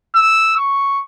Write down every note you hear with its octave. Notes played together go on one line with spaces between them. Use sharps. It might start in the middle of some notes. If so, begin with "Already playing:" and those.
E6
C#6